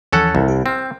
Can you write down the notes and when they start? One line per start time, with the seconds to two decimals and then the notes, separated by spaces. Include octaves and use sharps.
0.13 D#2 E3 F3 C#4 A4 F#5
0.35 C2
0.48 G4
0.66 C4 G5 F6